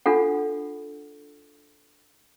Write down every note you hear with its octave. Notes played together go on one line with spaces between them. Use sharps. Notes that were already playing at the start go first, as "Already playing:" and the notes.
D4 F4 A4 F#5